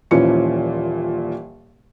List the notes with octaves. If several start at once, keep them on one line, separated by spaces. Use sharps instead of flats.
D#1 A#2 E3 F3 C#4 C#7